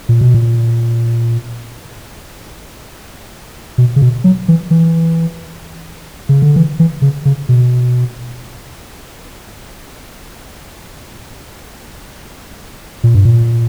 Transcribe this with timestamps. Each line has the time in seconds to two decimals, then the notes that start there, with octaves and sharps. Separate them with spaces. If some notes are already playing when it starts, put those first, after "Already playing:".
0.09 A#2
0.21 B2
0.34 A#2
3.78 B2
3.96 C#3
4.02 B2
4.24 F#3
4.48 E3
4.71 E3
6.29 C#3
6.42 D3
6.56 E3
6.79 E3
7.02 C#3
7.25 C#3
7.49 B2
13.04 A#2
13.15 G2
13.25 A#2